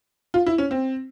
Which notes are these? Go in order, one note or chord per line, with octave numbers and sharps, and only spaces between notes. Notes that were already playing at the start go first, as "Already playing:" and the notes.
F4
E4
C#4
C4